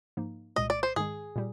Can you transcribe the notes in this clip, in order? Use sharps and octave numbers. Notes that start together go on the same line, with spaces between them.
G#2 F3 A#3 D#4
C2 A#2 G#3 D#5
D5
C5
G#2 D#3 G#3 G#4
A#2 G3